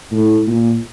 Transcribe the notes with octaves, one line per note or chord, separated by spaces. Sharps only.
A2
A#2